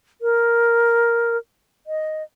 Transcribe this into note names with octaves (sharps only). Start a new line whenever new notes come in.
A#4
D#5